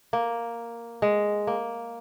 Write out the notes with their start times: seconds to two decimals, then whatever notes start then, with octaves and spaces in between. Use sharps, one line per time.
0.13 A#3
1.02 G#3
1.47 A#3